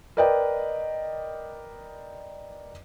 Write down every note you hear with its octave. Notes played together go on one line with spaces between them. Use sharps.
A#4 B4 D5 D#5 G5